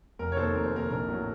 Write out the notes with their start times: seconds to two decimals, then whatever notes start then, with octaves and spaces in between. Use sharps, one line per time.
0.19 F1 A#4
0.32 C#5
0.36 D#2 D#3 A4 C5
0.54 F1 A#4
0.66 C5
0.72 D#2 D#3 A#4
0.90 A#1 A#4
1.08 A2 F#3